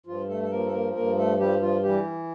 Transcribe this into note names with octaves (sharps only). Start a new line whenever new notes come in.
G2 F3 F4
A3 A4
A4
F3 A#3 A#4
A4
A#3 A#4
G2 A#3 A#4
A3 A4
F3 G3 G4
F3 F4
E3 G3 G4